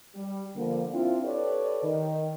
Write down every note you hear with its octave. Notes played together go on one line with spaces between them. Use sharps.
G3
D3 F3 G3 A#3
C4 D4 E4 F4
G4 A4 B4 C#5 D5
D#3